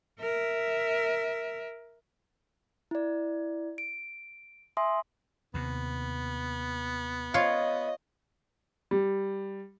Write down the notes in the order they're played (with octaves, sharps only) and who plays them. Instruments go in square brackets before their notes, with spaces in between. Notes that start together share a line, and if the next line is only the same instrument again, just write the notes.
[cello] A#4 E5
[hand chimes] E4 D5
D7
E5 G#5 C6 D#6
[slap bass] D#2 C3 [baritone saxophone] B3
[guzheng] F4 C#5 F5 [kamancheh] D#5
[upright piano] G3